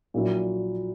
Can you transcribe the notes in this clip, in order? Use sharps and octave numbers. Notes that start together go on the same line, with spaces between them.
A#1 A#2 F#3 A#3 E4